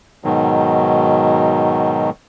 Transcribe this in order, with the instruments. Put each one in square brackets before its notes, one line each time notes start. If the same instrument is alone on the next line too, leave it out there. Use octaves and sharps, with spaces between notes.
[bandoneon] G#2 B2 D#3 F#3